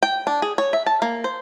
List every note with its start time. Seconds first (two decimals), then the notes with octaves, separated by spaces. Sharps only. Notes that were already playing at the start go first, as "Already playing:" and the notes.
0.03 G5
0.27 D4
0.42 G#4
0.58 C#5
0.73 E5
0.87 A5
1.02 A#3
1.24 C5